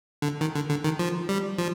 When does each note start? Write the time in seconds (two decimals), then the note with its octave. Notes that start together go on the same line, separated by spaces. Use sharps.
0.22 D3
0.41 D#3
0.55 D3
0.70 D3
0.84 D#3
0.99 F3
1.29 G3
1.59 F3